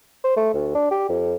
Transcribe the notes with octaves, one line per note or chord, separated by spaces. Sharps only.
C5
A3
D2
D4
G4
F2